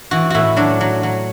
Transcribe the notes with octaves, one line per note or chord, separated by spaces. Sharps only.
E3 F#4
A2 E4 F#4
F#3 D4
F#3
F#3